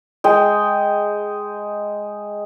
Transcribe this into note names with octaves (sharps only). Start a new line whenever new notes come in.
G#3 G5